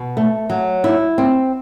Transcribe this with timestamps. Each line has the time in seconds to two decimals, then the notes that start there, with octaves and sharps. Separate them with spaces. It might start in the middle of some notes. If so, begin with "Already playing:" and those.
Already playing: B2
0.17 A3
0.50 F#3
0.84 E4
1.18 C4